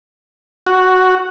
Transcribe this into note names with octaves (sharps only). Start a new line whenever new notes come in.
F#4